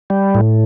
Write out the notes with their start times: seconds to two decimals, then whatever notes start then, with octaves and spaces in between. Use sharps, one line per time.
0.10 G3
0.35 A2